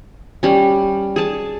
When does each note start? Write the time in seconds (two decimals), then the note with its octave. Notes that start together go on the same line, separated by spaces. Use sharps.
0.43 G3 C#4
1.16 G#4 A5